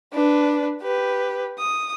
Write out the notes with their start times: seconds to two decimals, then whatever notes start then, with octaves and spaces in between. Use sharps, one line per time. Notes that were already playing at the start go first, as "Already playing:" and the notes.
0.14 D4 B4
0.82 G4 B4
1.59 D#6